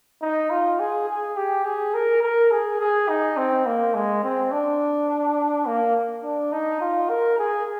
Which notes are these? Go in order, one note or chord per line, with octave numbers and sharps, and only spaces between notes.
D#4
F4
G#4
G#4
G4
G#4
A#4
A#4
G#4
G#4
D#4
C4
A#3
G#3
C4
D4
A#3
D4
D#4
F4
A#4
G#4